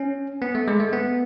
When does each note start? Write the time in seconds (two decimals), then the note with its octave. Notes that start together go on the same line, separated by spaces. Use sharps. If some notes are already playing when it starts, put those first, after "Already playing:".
Already playing: C#4
0.42 B3
0.55 A3
0.68 G#3
0.80 A3
0.93 B3